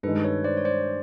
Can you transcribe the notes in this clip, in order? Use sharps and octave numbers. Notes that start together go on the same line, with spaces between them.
G2 D#3 G#3 A4 B4
B4 C#5
C5 D5
C#5
C5 D5